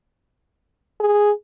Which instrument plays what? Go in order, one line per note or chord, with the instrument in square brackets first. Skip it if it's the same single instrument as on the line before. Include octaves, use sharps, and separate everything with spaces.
[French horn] G#4